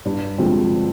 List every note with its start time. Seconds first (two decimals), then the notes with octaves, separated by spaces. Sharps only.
0.05 G2
0.38 D3 F3 G#3 C4